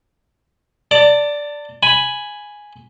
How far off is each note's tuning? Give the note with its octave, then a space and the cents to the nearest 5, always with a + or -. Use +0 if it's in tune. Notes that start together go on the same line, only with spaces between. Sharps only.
D5 -5 A5 +35
G#5 +0 B5 +0